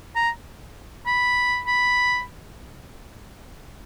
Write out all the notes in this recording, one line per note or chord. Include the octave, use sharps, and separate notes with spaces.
A#5
B5
B5